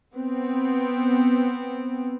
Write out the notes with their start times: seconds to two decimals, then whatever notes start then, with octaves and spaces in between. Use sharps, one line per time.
0.14 B3 C4